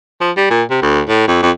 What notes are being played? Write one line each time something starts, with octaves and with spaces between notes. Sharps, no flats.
F3
G3
A#2
C3
D2
A2
F2
F2